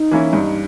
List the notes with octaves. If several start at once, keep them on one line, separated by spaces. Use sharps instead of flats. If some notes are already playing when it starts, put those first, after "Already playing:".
Already playing: D#4
E3 A#3 C#4 E4
G2 D#4